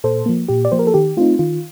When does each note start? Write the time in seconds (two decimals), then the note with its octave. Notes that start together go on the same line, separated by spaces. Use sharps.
0.04 A#2 A4 C5
0.26 F3 A#3
0.48 A#2 G4
0.65 D5
0.72 F3 A#3 C5
0.79 A#4
0.87 A4
0.94 D#3 G4
1.17 A3 C4 D#4 F4
1.39 D#3 F4